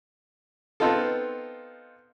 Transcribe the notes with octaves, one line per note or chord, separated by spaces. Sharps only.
B3 C4 D#4 F4 A4